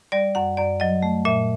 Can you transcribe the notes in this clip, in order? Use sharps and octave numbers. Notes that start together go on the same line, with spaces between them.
G3 D5
F#2 F#5
F#2 D5
F#3 D#5
A3
A#2 E5